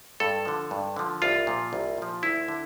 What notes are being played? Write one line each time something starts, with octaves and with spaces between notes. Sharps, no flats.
G2 A4
D3 F3
G2
D3 F3
C2 F4
A#2 F3
C2
A#2 F3
D2 E4
D3